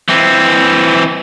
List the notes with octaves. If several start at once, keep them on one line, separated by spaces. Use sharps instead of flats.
E3 C4